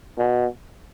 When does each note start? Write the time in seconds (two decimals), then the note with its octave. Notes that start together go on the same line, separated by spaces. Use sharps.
0.18 B2